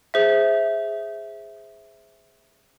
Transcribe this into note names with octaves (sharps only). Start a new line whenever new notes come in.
G#4 C5 E5